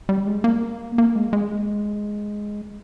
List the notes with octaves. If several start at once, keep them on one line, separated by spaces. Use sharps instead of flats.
G3
G#3
A#3
A#3
G#3
G#3